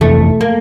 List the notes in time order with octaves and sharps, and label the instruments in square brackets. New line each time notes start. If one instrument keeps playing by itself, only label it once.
[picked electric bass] F2 C3 E3 [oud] A3
[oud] A#3